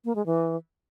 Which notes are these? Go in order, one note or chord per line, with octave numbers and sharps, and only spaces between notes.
A#3
G#3
E3